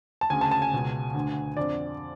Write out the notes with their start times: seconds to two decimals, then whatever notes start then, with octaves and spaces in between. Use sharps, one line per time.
0.21 A5
0.30 D2 C#3 G#5
0.41 A5
0.51 A5
0.62 G#5
0.73 C#2 B2
1.14 D2 D3
1.57 F2 D3 D5